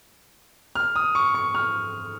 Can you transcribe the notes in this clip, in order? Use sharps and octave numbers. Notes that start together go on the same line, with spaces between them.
F6
D#6
C#6
C#6
F6